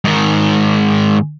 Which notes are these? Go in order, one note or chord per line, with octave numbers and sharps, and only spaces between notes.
G#2 D#3